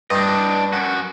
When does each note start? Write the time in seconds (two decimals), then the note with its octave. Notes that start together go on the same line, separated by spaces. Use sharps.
0.10 G2 D4 D#5
0.73 F#2 F#4